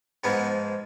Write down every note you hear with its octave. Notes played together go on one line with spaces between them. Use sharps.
G#2 F3 G#3 B3